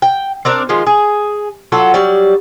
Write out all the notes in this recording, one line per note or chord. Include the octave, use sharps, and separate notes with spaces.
G5
C4 D4 A#4 D5
D#3 F3 G#3 F4
G#4
F#3 F4 A4 F#5
F#3 G3 D5